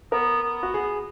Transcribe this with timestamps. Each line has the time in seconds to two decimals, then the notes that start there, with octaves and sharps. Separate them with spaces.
0.12 B3 A#4
0.43 B3
0.63 F#4
0.74 G#4